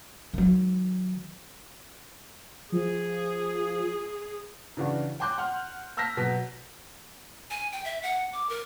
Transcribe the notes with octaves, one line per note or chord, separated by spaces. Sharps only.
D#3 F#3
F3 G#4
C#3 E3 D4 F#4
G5 G#5 C6 D6 F#6 G6
F#5 C6 F6
A5 E6 F6 G6 A#6 B6
B2 F#3 B6
G#5
G5
E5
F#5
D6
A#4